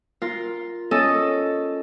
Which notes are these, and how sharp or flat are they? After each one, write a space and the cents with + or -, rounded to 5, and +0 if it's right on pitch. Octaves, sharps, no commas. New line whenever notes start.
F4 +0 A#4 +0
C#4 +0 A4 +0 D#5 +0